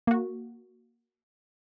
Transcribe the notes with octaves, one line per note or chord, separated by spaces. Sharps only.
A#3 F#4